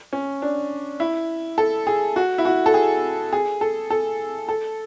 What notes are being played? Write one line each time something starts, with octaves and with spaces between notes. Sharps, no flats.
C#4
D4
E4
A4
G#4
F#4
E4
F#4
A4
G#4
G#4
A4
A4
A4